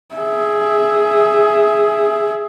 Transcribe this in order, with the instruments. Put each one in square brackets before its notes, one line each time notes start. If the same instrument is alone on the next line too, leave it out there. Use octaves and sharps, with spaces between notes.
[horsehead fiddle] G#4 E5